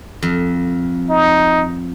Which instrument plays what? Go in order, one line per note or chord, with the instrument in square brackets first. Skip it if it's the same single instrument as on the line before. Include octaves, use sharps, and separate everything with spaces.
[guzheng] F2
[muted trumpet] D#4